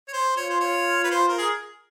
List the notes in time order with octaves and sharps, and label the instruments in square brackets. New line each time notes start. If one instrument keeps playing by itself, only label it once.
[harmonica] C#5
C5
[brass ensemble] F4 [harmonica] C#5
[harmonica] C5
C#5
B4
C5
A#4
G#4